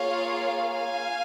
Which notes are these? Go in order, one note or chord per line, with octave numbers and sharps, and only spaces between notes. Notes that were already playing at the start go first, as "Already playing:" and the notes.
Already playing: A#3 F4 G#4 C#5 F5
F5 G#5